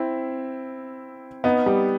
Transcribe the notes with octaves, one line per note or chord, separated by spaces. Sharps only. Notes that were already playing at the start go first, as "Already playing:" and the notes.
Already playing: C4 E4
B3 D#4
G3